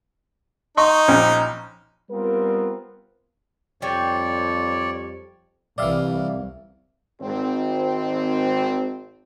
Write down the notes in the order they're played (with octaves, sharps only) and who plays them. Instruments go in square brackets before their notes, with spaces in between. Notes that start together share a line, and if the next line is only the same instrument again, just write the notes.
[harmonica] D#4 [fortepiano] D#5 C6 C#6
[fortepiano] A#1 C#4 G5
[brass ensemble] G3 B3 C4 F4 A#4
[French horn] F2 [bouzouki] G3 [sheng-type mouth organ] C#5 D5
[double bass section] C2 [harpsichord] E3 G3 [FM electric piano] D5 E5 F5
[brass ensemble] G#1 C4